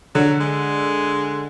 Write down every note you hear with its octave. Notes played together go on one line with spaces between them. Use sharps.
D3 F#3
G#3